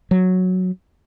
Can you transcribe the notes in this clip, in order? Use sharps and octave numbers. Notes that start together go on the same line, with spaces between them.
F#3